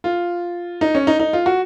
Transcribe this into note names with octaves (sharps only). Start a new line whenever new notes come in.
F4
D#4
C#4
D#4
D#4
F4
F#4